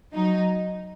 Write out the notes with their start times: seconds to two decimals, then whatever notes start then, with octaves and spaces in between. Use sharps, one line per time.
0.12 F#3 D#4